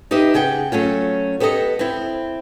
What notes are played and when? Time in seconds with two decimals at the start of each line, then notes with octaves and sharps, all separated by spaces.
0.11 D#4 G4 B4 D#5 E5
0.34 C#3 G#4 F#5 G5
0.72 F#3 A3 C#4 F4
1.40 B3 G4 A4 D5 D#5
1.79 C4 E4